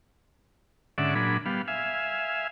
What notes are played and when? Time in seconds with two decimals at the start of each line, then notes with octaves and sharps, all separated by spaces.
0.98 G#2 D3 C#4 D5 E5 F#5
1.15 A#2 F#3 D4 G#4 B5
1.46 G3 B3 F5
1.68 E5 F5 G#5